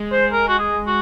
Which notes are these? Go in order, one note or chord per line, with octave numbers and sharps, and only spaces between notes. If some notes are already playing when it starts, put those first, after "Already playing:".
Already playing: G#3
C5
A#4
F#4
G#4
F#4